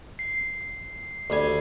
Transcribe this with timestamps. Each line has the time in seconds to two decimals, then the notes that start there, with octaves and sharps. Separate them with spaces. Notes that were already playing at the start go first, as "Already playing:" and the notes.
0.19 C7
1.30 D2 G3 G#5